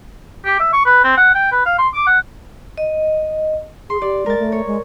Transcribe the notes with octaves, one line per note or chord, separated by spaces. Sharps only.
G4
E5
C#6
B4
C4
F#5
G5
B4
F5
C6
D6
F#5
D#5
G#4 C6
G4 D5
G#3 A#4 A6
A3
C#5
G#3